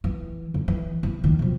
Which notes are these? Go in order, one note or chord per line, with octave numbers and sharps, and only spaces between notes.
E3
D3
E3
E3
D#2 D#3
B2 F3